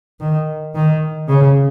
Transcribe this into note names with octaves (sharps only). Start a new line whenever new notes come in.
D#3
D#3
C#3